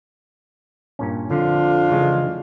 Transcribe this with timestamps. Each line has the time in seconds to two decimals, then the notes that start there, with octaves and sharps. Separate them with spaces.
0.99 G2 A#2 C#4
1.31 F2 D3 D4 F4
1.91 C#3 E3 G#3